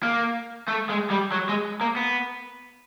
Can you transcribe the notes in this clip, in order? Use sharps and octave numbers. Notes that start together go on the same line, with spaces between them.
A#3
A3
G#3
G3
F#3
G#3
A#3
B3